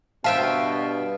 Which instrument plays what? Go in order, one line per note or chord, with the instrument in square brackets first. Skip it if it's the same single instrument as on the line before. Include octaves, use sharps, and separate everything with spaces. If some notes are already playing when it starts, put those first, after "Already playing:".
[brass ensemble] G2 B2 [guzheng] F4 E5 G5 [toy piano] C5 F5 A5